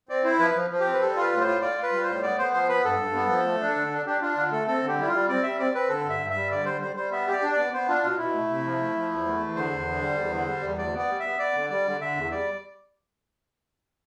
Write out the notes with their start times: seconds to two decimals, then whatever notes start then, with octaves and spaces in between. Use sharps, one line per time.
0.09 C4 D5
0.24 E4 C5
0.39 F3 B4
0.55 F3
0.70 F3
0.80 G4
0.86 C4
0.93 B4
1.01 G3 A4
1.16 F4 B4
1.31 A2
1.41 C5
1.47 F4
1.62 F4 D5
1.77 F4
1.83 B4
1.92 G3
2.03 A2 C5
2.23 B3 D5
2.38 B3 C5
2.53 F3 C5
2.69 B3 B4
2.84 G2 A4
2.99 G2
3.15 B3
3.30 F3
3.45 A3
3.61 D4
3.76 D3
3.91 D4
4.06 D4 G4
4.21 D4 F4
4.37 D3 F4
4.51 A3 A4
4.67 C4 A4
4.82 D3
4.88 G4
4.98 G3 E4
5.07 F4
5.13 G3
5.29 C4 D5
5.43 G3 E5
5.59 C4 D5
5.74 C4 B4
5.89 D3 A4
6.05 G2 E5
6.21 G2
6.30 E5
6.35 G3
6.51 D3 D5
6.66 G3 C5
6.81 G3 C5
6.96 G3 C5
7.11 B3 E5
7.27 G4
7.32 D5
7.43 D4
7.52 D5
7.58 B3
7.73 B3 C5
7.88 D4 F4
8.03 B2 F4
8.18 B2 E4
8.34 A3
8.49 C3
8.64 F3
8.80 A3
8.95 F3
9.11 E2
9.26 A3
9.41 E2
9.56 D3 C5
9.71 E2
9.87 D3
10.02 G3
10.17 E2
10.32 D3
10.47 G3
10.63 E2
10.78 D2 D5
10.94 B3 D5
11.09 G3
11.20 B3 E5
11.39 B3 D5
11.55 D3
11.70 G3 D5
11.85 D3
12.01 D3 E5
12.16 E2
12.31 G3 D5